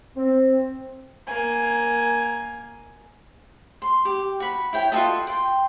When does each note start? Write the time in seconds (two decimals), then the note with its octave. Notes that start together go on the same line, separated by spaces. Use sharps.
0.16 C4
1.27 A#3 G#5
3.82 C6
4.05 G4
4.40 F#4 B5
4.73 E4 C#5 G5
4.92 F4 F#4 A4 D#5
5.27 G5 C6